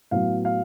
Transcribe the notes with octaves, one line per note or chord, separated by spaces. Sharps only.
A2 F#3 B3 F5
F5